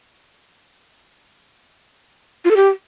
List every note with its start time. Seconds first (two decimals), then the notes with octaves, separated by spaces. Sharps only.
2.45 F4
2.51 A4
2.56 G4